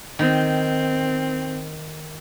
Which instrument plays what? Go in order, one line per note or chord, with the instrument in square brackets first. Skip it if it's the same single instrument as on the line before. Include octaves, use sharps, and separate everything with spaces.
[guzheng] D#3 [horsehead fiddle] C4